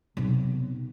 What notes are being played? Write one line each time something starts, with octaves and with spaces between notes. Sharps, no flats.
B1 C3